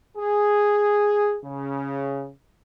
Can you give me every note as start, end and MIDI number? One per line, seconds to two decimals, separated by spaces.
0.17 1.37 68
1.45 2.29 49